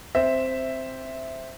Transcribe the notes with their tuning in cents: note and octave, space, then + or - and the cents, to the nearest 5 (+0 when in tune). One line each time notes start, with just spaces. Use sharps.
C4 +0 E5 +0